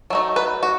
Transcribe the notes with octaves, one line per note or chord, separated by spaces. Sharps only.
F#3 A3 D#4
B4
F#4